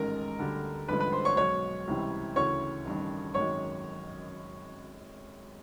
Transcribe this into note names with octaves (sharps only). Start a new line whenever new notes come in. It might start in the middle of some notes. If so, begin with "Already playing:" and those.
Already playing: A1 G#2 D#3 G#3 A#4 A#5
D2 D3 G3
A1 G2 D3 F3 G#3 B4 B5
B4 B5
C5 C6
C#5 C#6
B1 B2 G#3 C#5 C#6
C#2 C3 E3 G3
D2 C#3 E3 C#5 C#6
A1 G2 D#3
G#1 F#2 D#3 G#3 C#5 C#6